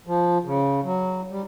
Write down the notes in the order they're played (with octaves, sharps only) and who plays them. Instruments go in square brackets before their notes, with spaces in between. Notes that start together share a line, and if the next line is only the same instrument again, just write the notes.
[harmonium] F3
C#3
F#3
G3